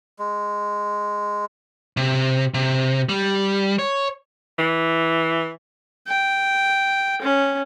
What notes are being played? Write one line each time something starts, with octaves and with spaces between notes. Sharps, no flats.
G#3
C3
C3
G3
C#5
E3
G5
C#4